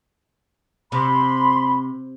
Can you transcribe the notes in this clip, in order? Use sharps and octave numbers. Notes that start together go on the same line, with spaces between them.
C3 B5 C6